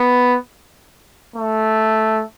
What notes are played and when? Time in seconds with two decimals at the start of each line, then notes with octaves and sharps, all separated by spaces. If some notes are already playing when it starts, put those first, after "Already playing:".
Already playing: B3
1.36 A3